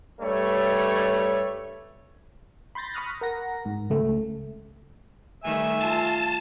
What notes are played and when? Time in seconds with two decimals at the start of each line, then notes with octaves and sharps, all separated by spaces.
0.21 G2 G3 A3 C#5
2.75 B5 C6 G6 A6 A#6
2.94 B5 C#6 D#6 F6 F#6 A#6
3.21 A#4 F#5 A#6
3.65 G#2
3.90 C#2 A3
5.44 D#3 G3 A3 E5 G#5
5.81 F4 A5